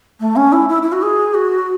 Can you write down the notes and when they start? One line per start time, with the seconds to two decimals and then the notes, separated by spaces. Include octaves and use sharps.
0.20 A3
0.36 C#4
0.52 E4
0.68 E4
0.82 E4
0.92 F#4
1.02 G#4
1.34 F#4